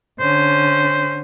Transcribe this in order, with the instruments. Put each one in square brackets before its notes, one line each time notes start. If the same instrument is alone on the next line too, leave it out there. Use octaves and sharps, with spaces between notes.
[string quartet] D3 C#4 [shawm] C5